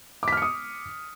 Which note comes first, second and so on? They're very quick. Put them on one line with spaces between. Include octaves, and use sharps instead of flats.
D6 B6 F6 C#7 D#6